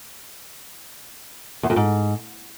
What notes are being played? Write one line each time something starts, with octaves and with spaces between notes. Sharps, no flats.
E2
F2
G#2